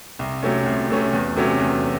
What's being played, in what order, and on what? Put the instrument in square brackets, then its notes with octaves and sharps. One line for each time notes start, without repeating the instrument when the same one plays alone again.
[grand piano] C2
C3 F#3 A3 C#4
C2
C3 F#3 A3 C#4
E2
C3 F#3 A3 C#4
E2